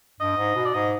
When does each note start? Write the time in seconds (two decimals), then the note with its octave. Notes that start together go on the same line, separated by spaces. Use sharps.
0.20 G2 D#5
0.37 G#2
0.56 B2
0.65 D5
0.74 G#2 D#5